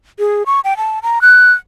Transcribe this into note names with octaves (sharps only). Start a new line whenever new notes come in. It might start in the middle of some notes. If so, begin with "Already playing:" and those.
G#4
C#6
G5
A5
A#5
F#6